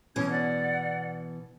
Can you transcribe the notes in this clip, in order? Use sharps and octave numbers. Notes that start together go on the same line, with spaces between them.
B2 E3 C#4 G#6
D5 F#5